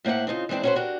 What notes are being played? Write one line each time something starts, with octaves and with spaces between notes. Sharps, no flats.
A2 A#3 C5 E5 F#5
C#3 C4 D#4 F4
E3 G#3 C4 D4 E4
C#4 D#4 F#4 A4 B4 C5
D4 F#4 G4 A#4